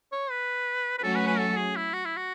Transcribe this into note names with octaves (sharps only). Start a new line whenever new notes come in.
C#5
B4
B4
F#3 A3 C#4 F#4 A4
B4
B4
A4
G#4
E4
F#4
E4
F#4